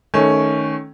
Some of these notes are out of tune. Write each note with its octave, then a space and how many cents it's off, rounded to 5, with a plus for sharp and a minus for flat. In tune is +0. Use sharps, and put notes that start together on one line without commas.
D#3 +0 A3 -15 C#4 +0